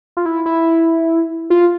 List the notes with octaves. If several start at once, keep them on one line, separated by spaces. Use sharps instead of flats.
F4
E4
E4
F4